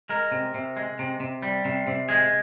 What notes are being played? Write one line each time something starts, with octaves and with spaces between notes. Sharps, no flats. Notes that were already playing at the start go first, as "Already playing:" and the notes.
G#3 A#4
C3
C3
G#3
C3
C3
G3
C3
C3
G#3 G#4